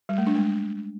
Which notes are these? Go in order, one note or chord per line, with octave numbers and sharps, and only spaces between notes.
G3
A3
D4
G#3